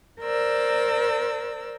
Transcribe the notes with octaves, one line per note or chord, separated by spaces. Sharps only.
A#4 C5 D5 E6